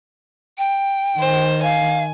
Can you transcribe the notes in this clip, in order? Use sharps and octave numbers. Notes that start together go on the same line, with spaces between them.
G5
D#3 C5
F5 G#5